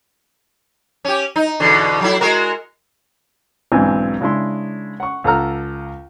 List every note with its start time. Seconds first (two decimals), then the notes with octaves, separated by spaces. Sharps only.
1.05 C#4 G4
1.36 D#4
1.60 E2 B2 D3
2.01 F#3 A3 E4
2.21 G#3 F#4 A#4
3.72 B1 G#2 E3 C4 D4 G#5
4.21 C#3 G#3 D4 E4 C6
5.00 F#5 C#6
5.24 C#2 A4 F#5 A#5 F6